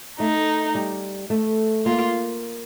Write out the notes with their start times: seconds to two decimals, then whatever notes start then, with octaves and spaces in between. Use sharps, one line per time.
0.20 A3 D#4
0.75 G3
1.30 A3
1.85 A#3 F4